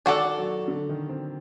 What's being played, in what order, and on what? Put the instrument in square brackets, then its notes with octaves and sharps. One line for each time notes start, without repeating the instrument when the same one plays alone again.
[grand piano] D#3 [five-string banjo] D4 F#4 A4 D5
[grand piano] F#3
D3
D#3
C4